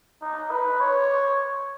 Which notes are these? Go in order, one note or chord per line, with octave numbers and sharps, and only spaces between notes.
D#4
B4
C#5